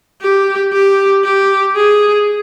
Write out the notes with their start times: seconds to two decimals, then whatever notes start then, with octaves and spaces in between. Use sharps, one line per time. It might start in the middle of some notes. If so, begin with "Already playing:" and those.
0.22 G4
0.73 G4
1.24 G4
1.76 G#4